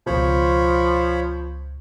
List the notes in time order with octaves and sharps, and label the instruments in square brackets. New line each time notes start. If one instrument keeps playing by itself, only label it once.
[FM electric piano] C#2 B2 [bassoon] F3 [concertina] C5 C#5 B5